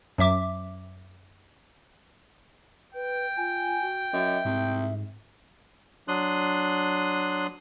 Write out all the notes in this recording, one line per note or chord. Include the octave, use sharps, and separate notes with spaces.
F#2 F#3 E5 D6
B4 G5
F4 G#5
F#4
F#2 D#5 E5
C2 G#2
F#3 D4 C6 D#6 F#6